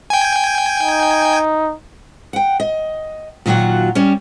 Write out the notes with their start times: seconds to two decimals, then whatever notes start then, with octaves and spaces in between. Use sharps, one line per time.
0.10 G5 G#5
0.83 D#4
2.33 F#5 G5
2.60 D#5
3.46 A#2 D#3 F#3 F4 F#4 F#5
3.95 G3 C#4